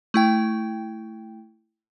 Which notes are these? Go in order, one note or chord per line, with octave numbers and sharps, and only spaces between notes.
A3 E4 G5